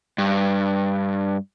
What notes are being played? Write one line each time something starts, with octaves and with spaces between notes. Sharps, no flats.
G2